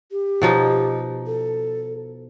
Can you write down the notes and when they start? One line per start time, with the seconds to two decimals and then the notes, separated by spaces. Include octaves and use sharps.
0.12 G4
0.42 B2 F3 D#4
1.27 A4